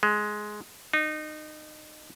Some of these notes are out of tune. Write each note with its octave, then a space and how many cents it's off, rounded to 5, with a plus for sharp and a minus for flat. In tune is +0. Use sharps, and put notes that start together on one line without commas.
G#3 +10
D#4 -25